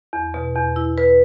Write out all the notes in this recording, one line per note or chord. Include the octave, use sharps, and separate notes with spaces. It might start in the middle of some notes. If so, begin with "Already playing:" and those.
E2
B2
E2
E4
B4